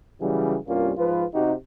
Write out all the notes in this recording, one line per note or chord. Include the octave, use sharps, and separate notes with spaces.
C#3 E3 F#3 G3
C2 G2 A#3 C#4 F4
G#2 F3 F4 B4
C3 D#4 F#4 G4